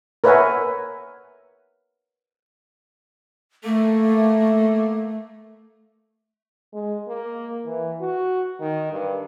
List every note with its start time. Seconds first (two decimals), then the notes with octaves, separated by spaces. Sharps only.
0.24 A#4 B4 C#5 E5 F#5 G#5
3.64 A3 A#3 A4
6.73 G#3
7.08 A#3
7.66 E3
8.01 F#4
8.60 D#3
8.92 G2